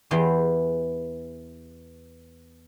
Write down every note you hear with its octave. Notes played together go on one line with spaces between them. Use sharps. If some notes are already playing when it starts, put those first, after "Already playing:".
E2 E3 G4 G#4 G5 C6